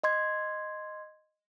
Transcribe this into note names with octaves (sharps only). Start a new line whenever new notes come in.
D#5 C6 G#6